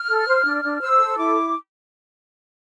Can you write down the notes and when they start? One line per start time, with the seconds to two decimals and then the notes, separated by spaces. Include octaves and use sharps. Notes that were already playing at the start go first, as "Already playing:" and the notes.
Already playing: F6
0.09 A4
0.27 C5
0.45 D4
0.63 D4
0.81 C5 E6
0.99 A4
1.17 E4 D6